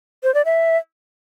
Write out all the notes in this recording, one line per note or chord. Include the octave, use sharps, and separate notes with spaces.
C5
D5
E5